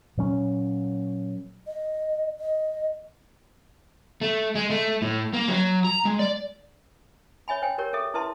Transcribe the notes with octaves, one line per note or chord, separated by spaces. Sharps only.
A#2 F#3 C#4
D#5
D#5
A3
G#3
A3
A2
A#3
F#3
A#5
G#3
D5
C#5 E5 G#5 B5
C5 G5 G#5
G4 A#4 C#5
G#4 A4 E5
E4 B4 E5 A5 C6